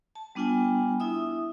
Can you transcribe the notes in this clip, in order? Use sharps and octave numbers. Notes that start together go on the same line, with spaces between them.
A5
G3 B3 D4 F4 G5 G#5
E4 E5 D#6